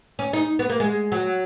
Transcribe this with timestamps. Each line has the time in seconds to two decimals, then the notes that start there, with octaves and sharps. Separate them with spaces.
0.19 C#4
0.33 D#4
0.59 B3
0.69 A#3
0.80 G#3
1.12 F#3